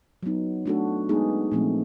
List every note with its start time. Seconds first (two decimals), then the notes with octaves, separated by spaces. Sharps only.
0.23 F#3 B3 D#4
0.66 A3 D4 F#4 A4
1.09 G#3 B3 D#4 G#4
1.52 A#2 F3 A3 C4